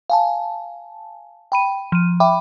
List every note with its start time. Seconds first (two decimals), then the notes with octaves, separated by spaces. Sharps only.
0.10 F5 G#5 A5
1.52 G5 B5 D#7
1.92 F3 D#7
2.20 E5 G5 B5 D6